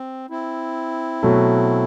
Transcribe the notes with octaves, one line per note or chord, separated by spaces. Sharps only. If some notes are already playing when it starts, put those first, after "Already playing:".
Already playing: C4
C4 E4
B2 F#3 A3